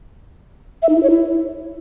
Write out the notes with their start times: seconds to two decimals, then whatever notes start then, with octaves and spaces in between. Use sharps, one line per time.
0.82 E5
0.89 D#4
0.96 E4
1.03 C#5
1.10 E4